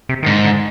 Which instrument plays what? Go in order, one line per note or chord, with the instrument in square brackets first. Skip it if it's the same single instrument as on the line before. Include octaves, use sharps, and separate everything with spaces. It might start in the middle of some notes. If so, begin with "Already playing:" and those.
[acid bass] C3
D#3
[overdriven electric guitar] G#2 [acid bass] D3
[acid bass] D3